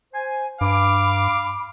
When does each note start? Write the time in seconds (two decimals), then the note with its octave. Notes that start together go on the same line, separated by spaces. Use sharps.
0.13 C5 G#5
0.61 G2 F5 B5 D6